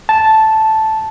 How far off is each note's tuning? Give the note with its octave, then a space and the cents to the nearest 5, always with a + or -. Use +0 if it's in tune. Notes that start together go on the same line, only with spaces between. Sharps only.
A5 -5